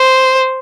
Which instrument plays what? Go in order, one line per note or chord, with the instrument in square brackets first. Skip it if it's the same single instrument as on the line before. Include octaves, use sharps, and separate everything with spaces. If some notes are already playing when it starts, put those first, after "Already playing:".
Already playing: [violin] C5